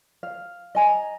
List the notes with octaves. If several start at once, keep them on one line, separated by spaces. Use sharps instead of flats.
F5
D#5 G#5 A#5